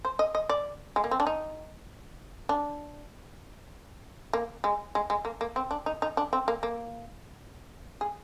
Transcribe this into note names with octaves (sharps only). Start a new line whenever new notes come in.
C5
D#5
D#5
D5
G#3
A#3
C4
D4
D#4
D4
A#3
G#3
G#3
G#3
A#3
A#3
C4
D4
D#4
D#4
D4
C4
A#3
A#3
G#4